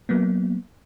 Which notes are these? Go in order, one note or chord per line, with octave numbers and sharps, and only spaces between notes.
F#3 A#3 B3